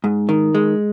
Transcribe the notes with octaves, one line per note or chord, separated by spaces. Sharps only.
G#2
D#3
G#3